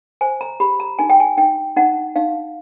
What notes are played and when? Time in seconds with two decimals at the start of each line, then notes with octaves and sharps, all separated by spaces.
0.21 C5 G#5
0.41 A#5
0.60 G4 B5
0.80 A#5
0.99 D#4 G#5
1.10 G5
1.20 G#5
1.38 D#4 G5
1.77 D#4 F#5
2.16 D#4 F5